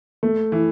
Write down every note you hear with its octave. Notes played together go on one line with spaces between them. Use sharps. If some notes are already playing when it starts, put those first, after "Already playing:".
A3
E3